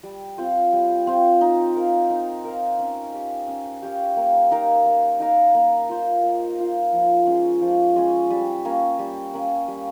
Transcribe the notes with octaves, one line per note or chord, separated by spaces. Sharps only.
G3
C4 F4 C5
G3
C4 F4 C5
D#4
A#4 F5
D#4
A#4 F5
C#4
G4 C#5 F5
C#4
G4 C#5 F5
A#3
D#4 A#4 F5
A#3
D#4 A#4 F5
A#3
F4 C5
A#3
F4 C5
F3
G#3 C#4
F3
G#3 C#4
G3
A#3 C#4
G3
A#3 C#4
G3